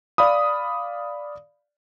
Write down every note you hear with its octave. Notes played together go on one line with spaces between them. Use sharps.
D5 F5 B5 D#6